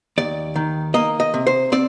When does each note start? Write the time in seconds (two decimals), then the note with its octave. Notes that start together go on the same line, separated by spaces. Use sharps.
0.18 D#2 D5
0.56 D#3
0.94 A#3 D#5
1.20 D#5
1.34 C3
1.47 C5
1.72 C4 D5